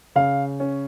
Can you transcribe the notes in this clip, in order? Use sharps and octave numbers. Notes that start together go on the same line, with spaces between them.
C#3 F5
C#4